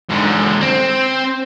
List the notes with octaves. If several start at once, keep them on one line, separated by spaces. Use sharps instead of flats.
G#2 D3
C4